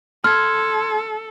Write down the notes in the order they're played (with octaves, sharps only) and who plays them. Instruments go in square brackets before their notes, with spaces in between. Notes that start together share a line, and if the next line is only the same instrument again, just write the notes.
[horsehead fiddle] A4 [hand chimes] C6 G#6 [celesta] F6